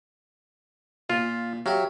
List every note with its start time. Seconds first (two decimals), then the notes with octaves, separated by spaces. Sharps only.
1.10 A#2 F4
1.66 F#3 G4 E5 F5